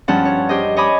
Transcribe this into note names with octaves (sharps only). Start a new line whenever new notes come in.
G2 F3 C#4 F#5 A5
C#5
G4 C5 D#5
C#5 D#5 G#5 B5 D6 D#6